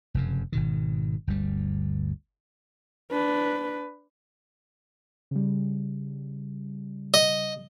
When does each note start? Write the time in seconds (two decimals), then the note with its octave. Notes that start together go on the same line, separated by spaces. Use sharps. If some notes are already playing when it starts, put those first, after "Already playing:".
0.14 F1 F#2 C#3
0.52 G#1 B2 D#3
1.27 G1 D2 G3
3.11 D4 B4
5.31 C#3 G3
7.14 D#5